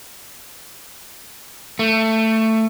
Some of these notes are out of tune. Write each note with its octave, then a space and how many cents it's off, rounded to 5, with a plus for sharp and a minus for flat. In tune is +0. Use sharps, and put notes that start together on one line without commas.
A3 +15